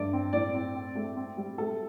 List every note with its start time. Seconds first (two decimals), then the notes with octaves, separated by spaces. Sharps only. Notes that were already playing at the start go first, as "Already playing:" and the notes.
Already playing: G2 A3 D5
0.13 C4
0.33 A2 D5
0.55 C4
0.75 C4
0.95 A3
1.16 C4
1.37 G3
1.58 A3 A4